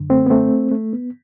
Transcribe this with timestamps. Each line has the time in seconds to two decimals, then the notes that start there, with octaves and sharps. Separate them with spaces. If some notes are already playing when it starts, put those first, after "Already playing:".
Already playing: F#2 D3
0.10 A3 C4
0.26 B3
0.30 A3 C4
0.72 A3
0.93 B3